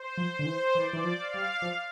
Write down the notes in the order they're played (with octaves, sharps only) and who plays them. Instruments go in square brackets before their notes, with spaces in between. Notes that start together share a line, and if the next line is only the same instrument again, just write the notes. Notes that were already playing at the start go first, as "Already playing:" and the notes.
Already playing: [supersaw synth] C5
[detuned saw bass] F3
[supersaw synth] C5
[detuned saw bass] D3
E3
[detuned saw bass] E3 [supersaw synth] D5
[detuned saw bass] E3
F3
[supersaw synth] F5
[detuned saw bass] G3
F3